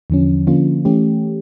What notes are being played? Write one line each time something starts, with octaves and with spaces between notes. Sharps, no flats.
E2 D3 F3 C#4
D3 F3 A#3 C#4 F4
E3 A3 C#4 G4